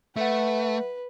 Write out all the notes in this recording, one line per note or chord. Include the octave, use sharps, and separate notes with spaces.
A3 B4 E5 F#5